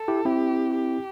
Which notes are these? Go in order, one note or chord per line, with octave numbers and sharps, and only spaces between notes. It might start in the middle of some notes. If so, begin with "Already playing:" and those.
Already playing: A4
E4 G4
C4 E4 G4
G4